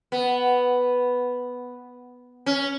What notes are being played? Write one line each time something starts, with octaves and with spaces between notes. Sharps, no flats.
B3
C#4